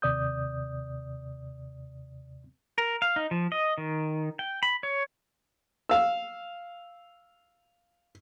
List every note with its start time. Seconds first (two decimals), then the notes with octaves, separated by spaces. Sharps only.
0.02 D#2 C3 D5 D#6 G6
2.78 A#4
3.02 F5
3.16 D#4
3.31 F3
3.52 D#5
3.78 D#3
4.39 G5
4.63 B5
4.83 C#5
5.89 F5 E6